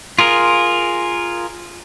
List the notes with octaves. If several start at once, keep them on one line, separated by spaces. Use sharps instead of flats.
F4 G#4 A#4